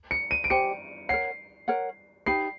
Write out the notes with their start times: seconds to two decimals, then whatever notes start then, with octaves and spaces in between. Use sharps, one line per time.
0.11 C#7
0.31 D#7
0.44 D7
0.50 G4 C5 D#5 G#5 C#7
1.09 A#4 C#5 F#5 C7
1.68 A#4 C#5 F#5
2.26 D#4 G4 B4 C7